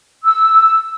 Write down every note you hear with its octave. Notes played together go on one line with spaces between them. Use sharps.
E6